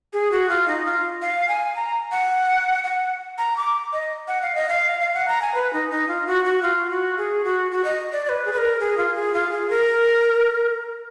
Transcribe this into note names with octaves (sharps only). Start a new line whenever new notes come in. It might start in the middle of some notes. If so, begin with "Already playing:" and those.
G#4
F#4
F4
D#4
F4
F5
G#5
A#5
F#5
F#5
A#5
D6
D#5
F#5
F5
D#5
F5
F5
F#5
A#5
G#5
B4
D#4
D#4
F4
F#4
F#4
F4
F#4
G#4
F#4
F#4
D#5
D5
D5
B4
G#4
B4
A#4
G#4
F4
G#4
F4
G#4
A#4